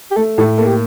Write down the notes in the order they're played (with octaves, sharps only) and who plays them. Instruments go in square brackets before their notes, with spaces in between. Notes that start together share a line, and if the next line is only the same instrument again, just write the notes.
[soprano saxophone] G4
[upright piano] A3 [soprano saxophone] A4
[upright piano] A2 [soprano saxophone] A4
[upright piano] A#3 [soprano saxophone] A4
[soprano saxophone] G4